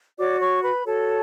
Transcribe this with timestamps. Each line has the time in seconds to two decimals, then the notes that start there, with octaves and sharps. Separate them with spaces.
0.19 F#4 C#5 D5 D6
0.40 C#5 C#6
0.63 B4 B5
0.85 F#4 A4 C#5 A5